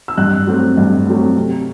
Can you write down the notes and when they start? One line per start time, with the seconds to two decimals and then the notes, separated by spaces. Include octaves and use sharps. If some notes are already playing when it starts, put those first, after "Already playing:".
0.08 E6
0.17 G2 F#6
0.47 F#3 A3 C4
0.77 G2
1.07 F#3 A3 C4
1.37 C3